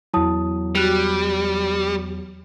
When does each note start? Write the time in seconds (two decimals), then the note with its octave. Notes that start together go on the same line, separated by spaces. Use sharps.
0.14 E2 F#3 E4 A5 D#6
0.75 G3 F#4 F#6 F7